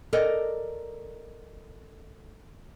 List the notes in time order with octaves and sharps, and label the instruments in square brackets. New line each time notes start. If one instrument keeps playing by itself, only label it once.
[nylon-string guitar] A4 A#4 D5 D#5